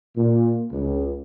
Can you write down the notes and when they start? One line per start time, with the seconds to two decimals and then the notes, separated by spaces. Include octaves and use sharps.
0.18 A#2
0.72 C#2